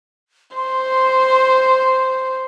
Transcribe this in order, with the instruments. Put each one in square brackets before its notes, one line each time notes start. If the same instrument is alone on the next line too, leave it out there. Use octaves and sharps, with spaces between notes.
[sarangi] C5 [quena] C6